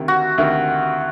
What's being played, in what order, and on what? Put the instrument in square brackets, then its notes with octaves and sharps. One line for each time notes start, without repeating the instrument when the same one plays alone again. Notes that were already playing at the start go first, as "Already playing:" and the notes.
Already playing: [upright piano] D2 C3 D#3
[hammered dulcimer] F#4
[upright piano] D2 C3 D#3